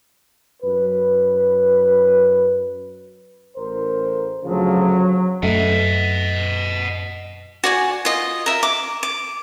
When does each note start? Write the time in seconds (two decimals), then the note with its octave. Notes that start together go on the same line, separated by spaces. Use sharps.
0.62 F#2 B4
3.57 A1 A#4 C5
4.44 D2 C#3 F3 F#3
5.43 F#2 A3 D#5 F#5
7.64 F#4 D5 G#5
8.05 F4 D#5
8.46 A#4 E5
8.63 D6
9.03 D6